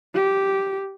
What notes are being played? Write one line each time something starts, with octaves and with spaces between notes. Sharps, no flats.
G4